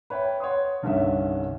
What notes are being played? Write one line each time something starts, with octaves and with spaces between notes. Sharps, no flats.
B4 C#5 E5 G5
C#5 F#5 C6 D#6
C2 G2 D3 D#3 C#4 E5